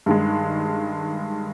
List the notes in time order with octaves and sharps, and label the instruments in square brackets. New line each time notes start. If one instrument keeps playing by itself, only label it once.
[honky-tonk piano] G2 D#3 G#3